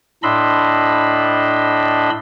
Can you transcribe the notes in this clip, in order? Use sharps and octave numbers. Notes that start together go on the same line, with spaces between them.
A2 D4 D#5 B5 C6 E6